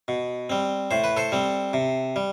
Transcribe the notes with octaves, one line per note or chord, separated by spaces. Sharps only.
B2
G3 C4
A2 C5
B4
A4 C5
G3 C4
C3
G3